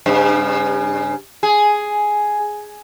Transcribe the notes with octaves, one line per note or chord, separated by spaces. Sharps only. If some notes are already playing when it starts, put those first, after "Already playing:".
G2 C#3
G#4